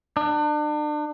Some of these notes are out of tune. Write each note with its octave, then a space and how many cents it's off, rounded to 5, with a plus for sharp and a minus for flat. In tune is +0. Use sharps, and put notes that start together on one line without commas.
D4 +35